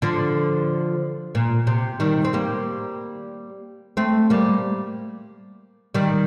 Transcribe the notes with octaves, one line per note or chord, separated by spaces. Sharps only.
D3 F3
A#2
C3
D#3 G3
C4
G3 A#3
A3 C4
G3 A#3
D#3 G3